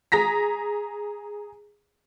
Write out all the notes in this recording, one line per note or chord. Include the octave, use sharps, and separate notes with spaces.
G#4 A#5 A#6 B6